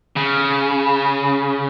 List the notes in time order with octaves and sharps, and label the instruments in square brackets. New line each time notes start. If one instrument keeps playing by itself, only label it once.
[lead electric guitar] C#3